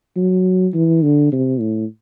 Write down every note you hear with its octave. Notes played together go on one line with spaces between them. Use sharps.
F#3
E3
D3
C3
A2